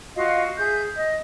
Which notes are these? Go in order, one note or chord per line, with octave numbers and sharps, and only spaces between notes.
F4 F#4 D#5 F5
G#4 E5 G6
D#5